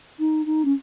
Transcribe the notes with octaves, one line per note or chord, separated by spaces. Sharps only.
D#4
D#4
C#4